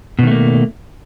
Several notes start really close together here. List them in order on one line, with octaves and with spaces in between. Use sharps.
B2 D#3 A3 A#3